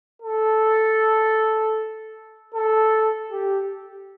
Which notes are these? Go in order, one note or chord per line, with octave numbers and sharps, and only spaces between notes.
A4
A4
G4